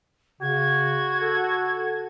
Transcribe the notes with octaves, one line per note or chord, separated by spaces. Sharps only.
C#3 F#4 G#6
A4